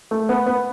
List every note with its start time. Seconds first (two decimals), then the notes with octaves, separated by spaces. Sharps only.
0.11 A3
0.29 B3
0.46 B3